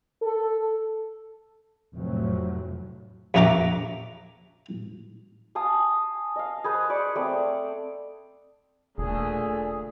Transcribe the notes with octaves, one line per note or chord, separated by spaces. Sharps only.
A4
F1 F2 A2 F3 F#3
A#1 F2 F#4 E5 A#5 D6
F5 G#5 A5 D#6
D#5 F5
G#4 B4 C5
B4 D5 C#6
A3 C4 C5 D5
E1 A#2 D3 A3 G#4